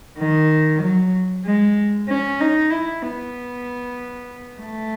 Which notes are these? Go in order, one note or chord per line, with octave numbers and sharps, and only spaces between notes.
D#3
F#3
G#3
C#4
D#4
E4
B3
A3